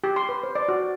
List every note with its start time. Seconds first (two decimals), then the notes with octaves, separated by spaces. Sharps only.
0.04 G4
0.16 C6
0.29 B4
0.43 C5
0.55 D5
0.68 F#4